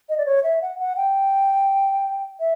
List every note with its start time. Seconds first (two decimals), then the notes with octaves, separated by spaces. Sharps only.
0.09 D#5
0.18 D5
0.26 C#5
0.44 E5
0.62 F#5
0.79 F#5
0.97 G5
2.40 E5